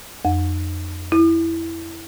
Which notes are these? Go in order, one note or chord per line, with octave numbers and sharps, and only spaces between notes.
F2
E4